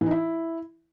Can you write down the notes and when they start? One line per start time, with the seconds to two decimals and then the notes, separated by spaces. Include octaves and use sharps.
0.01 E3
0.06 D#4
0.11 E4